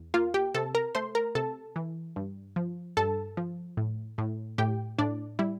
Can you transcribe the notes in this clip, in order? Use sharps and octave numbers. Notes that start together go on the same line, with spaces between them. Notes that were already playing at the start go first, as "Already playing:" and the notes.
Already playing: E2
A#3 F4 F5
G4 G5
C3 A4 A5
A#4 A#5
A3 C5 C6
A#4 A#5
C3 A4 A5
E3
G2
F3
G2 A4 A5
F3
A2
A2
A2 G4 G5
A2 D4 D5
G3 E4